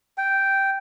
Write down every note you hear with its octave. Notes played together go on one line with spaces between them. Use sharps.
G5